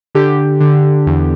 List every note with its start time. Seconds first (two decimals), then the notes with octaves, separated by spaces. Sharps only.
0.15 D3 G4
0.60 D3
1.06 E2